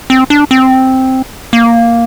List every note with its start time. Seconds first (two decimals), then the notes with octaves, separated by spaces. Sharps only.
0.10 C4
0.30 D4
0.51 C4
1.53 A#3